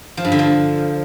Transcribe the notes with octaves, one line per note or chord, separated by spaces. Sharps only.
F3
G2
D3
F3